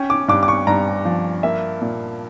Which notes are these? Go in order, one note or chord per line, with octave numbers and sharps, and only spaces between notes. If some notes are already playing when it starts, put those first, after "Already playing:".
Already playing: C#4 G5
D6
G2 D6
D6
C#6
G2 A#5
F3
A#3 E5
A#2